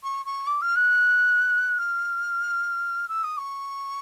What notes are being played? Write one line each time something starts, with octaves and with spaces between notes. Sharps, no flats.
C#6
C#6
D6
F6
F#6
F6
E6
D#6
C#6